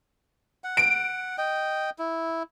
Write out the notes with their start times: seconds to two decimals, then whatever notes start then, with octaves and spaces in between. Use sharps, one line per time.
0.64 F#5
0.77 D7
1.38 D#5 G5
1.99 E4